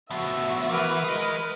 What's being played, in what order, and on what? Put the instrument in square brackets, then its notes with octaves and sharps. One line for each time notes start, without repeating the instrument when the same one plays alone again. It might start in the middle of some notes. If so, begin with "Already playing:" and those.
[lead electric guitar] F3 B3 [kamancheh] F#4 E5
[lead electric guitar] E3 [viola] A#4 B4
[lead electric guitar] G#4 D#5